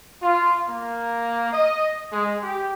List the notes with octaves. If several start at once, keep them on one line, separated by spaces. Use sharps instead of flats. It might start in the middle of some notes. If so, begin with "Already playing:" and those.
F4
A#3
D#5
G#3
G4